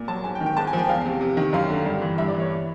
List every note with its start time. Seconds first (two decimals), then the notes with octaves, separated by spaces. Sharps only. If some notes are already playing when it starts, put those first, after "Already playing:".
Already playing: A#2
0.08 F#3 A5
0.24 G#2 G#5
0.35 G5
0.41 D#3
0.46 G5
0.57 G#2 A5
0.67 G#5
0.73 F3
0.78 G5
0.89 E2 F5
1.06 C3
1.21 C3
1.37 D#3
1.53 F#2 F5
1.70 D3
1.86 G2
2.02 E3
2.18 G2 E5
2.28 D5
2.34 E3
2.39 C#5